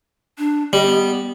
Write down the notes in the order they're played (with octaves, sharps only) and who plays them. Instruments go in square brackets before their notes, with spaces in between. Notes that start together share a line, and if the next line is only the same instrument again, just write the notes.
[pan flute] D4
[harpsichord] G3 [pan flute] D#5
[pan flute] B3